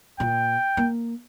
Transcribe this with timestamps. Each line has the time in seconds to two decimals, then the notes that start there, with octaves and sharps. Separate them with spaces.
0.20 A#2 G5
0.77 A#3